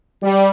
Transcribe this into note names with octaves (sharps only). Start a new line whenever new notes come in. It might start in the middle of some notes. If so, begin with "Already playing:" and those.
G3